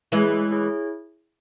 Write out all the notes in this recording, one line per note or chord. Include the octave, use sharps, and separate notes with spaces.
E3 G#3 E4 G#4 C#5
E4 G#4 C#5